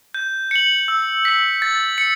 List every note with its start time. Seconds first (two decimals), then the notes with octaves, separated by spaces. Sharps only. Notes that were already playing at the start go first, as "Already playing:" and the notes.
0.14 G6
0.51 C#7 F#7
0.88 E6
1.25 B6 F#7
1.62 A6
1.98 C#7